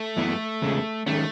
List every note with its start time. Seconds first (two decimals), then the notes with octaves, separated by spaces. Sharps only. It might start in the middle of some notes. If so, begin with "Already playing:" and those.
Already playing: A3
0.17 F#2 E3 B3 E4
0.62 E2 C#3 G#3
1.06 D#3 G#3 A3 C#4